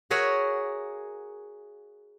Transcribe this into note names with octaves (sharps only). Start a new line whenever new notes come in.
F#4 G#4 A#4 C#5 E5 F#5